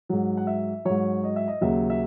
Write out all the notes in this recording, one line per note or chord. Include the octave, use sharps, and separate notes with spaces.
G#2 F#3
F#5
E5
G#2 F#3 C#5
D#5
E5
D#5
D#2 C#3 F#3 E5
E5